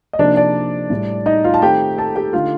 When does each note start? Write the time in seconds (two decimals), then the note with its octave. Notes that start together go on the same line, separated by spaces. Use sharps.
0.13 D#5
0.19 C3 F3 A#3 D4 D#4 D5
0.36 D4 D5
0.90 A2 G3 D4
1.26 D#4 D#5
1.44 F4 F5
1.54 A5
1.62 D#3 A3 C4 D#4 G4 G5
1.98 A4 A5
2.16 G4 G5
2.33 D3 A3 D#4 F4 F5